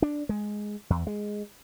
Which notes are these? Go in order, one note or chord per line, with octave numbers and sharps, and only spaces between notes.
D4
G#3
E2
G#3